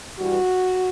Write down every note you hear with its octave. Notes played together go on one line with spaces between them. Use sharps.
G2 E3 G3 F#4